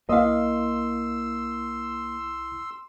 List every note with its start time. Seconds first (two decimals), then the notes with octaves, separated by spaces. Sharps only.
0.09 C2 A#3 E4 D#5 F5 C6 E6